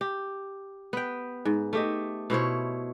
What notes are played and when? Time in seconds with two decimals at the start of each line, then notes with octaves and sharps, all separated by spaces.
0.01 G4
0.93 B3 G5
1.45 G#2
1.73 A3 G4 D#5
2.30 B2 E4 C5 C#5